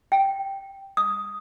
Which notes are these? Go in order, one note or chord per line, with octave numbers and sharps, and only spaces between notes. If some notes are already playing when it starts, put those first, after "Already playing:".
G5
D#6